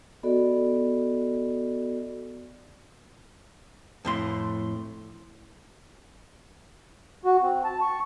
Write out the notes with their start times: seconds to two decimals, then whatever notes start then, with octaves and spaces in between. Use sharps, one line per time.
0.23 B3 F#4 A4 D5 D#5
4.05 F2 A2 C6
7.25 F#4
7.42 C4
7.64 A5
7.81 C#6